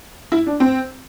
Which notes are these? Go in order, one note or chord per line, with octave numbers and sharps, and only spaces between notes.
E4
D4
C4